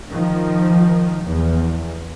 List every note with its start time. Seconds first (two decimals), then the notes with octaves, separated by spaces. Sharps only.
0.10 D#3 F3
1.24 E2